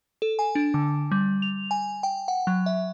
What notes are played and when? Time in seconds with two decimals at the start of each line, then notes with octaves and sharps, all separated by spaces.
0.22 A4
0.39 G#5
0.55 D4
0.74 D3
1.11 G3
1.42 F7
1.71 G#5
2.03 G5
2.28 F#5
2.47 F#3
2.66 E5